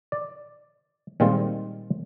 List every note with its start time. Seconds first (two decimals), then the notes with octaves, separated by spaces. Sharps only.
0.12 D5
1.20 A#2 D#3 G3 G#3 C4 F4